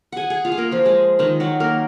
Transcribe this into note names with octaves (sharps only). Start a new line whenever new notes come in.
G#4 F#5 G#5
G#4 G#5
F4 F5
G#4
A#3 A#4
F3 F4
G#3 G#4
D#3 D#4
F#3 F#4
A#3 A#4